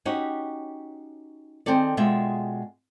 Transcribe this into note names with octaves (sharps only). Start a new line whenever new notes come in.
C#4 D#4 F#4 G4
D#3 C4 G#4 A4 D5
B2 G#3 F4 G#4 E5 G5